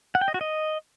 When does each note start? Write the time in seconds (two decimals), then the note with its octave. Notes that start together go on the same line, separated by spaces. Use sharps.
0.15 F#5
0.21 G5
0.28 D#5
0.34 F#4
0.41 D#5